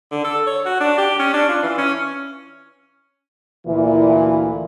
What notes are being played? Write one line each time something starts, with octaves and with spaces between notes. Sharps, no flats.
D3
A4
C#5
F#4
D4
G4
C#4
D4
F4
E3
C#4
D2 A#2 E3 E4